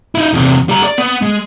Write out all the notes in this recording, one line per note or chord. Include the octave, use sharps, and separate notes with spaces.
D#4 E4
E2 C3
G3 A#5
D5
B3
G#3